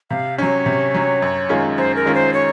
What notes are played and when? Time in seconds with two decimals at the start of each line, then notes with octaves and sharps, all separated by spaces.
0.10 C3 F5
0.38 F#3 C#4 C#5
0.66 C3
0.94 F#3 C#4
1.22 F#2
1.49 D#3 G#3 C#4 F4
1.78 F#2 C5
1.96 A#4
2.05 D#3 G#3 C#4 F4
2.15 C5
2.33 C#5